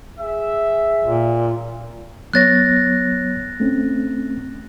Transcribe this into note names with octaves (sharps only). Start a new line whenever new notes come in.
G#4 E5
A#2
F#3 B3 C#5 F#6 A6 A#6
A3 C4 C#4